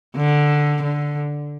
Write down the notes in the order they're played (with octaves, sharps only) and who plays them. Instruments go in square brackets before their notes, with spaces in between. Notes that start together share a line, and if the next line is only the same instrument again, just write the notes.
[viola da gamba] D3
D3